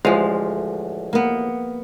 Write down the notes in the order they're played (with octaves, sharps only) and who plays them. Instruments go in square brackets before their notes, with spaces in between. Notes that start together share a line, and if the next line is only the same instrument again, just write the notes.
[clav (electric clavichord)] A1 D2 F5 [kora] F3 G#3
[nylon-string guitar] A#3 B3